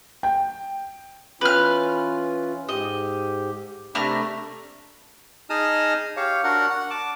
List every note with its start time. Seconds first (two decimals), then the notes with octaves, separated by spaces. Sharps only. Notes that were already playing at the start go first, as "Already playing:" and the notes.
0.23 G5
1.41 E3 C#4 F4 B4 F6
2.69 G#2 G4 D#5
3.95 C3 A3 D4 A#4 B5 F6
5.50 D#4 G#4 D#5 A5 D#6 F6
6.17 G4 C#5 F5
6.44 D4 F#4 A#4 F#5
6.70 F#5
6.90 A5 D6